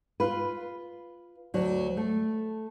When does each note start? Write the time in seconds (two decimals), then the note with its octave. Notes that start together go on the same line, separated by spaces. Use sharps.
0.20 F4 B4
1.54 D2 F#3
1.97 A3